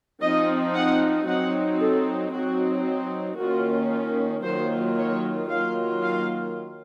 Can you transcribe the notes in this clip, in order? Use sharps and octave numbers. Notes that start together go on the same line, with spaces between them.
F3 C4 D#4 D#5
F#5
F#3 C4 D#4 F#5
A4
F#3 C4 D#4 F#4
D#3 A#3 C#4 F4 F#4
F4
D#3 F#3 A#3 F4 C5
C#5
D#3 F#3 A#3 F4 F5
F5